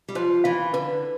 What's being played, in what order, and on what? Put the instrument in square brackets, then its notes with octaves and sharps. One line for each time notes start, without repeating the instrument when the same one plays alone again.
[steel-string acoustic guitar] G3
[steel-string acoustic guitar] F3 [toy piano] C5
[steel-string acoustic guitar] E3 [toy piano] F5
[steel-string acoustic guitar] D3 [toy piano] B4